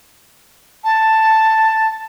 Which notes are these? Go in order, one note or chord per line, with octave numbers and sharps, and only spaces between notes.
A5